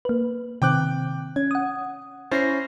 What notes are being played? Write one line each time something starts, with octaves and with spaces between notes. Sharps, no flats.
A#3 B4
C3 D#3 C4 G5 D6 F#6
C#4 G#6
F#5 D#6
C#4 E4 C5 A6 A#6 C7